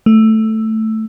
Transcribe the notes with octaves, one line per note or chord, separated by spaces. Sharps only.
A3